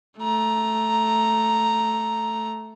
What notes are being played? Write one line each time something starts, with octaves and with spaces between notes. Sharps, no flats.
A3 A#5